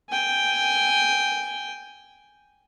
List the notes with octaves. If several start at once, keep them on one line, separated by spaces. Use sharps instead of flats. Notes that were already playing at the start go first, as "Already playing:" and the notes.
G5 G#5